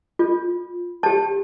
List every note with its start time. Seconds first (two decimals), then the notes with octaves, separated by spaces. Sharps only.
0.19 F4
1.03 G4 A5